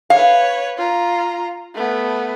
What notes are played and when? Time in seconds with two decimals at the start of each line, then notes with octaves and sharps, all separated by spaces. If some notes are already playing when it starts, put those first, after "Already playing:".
0.10 B4 C#5 F5
0.77 F4 A#5
1.75 A3 B3